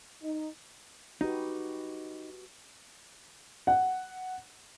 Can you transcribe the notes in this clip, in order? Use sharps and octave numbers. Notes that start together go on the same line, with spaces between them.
D#4
D#4 F#4 G4 B4
F#5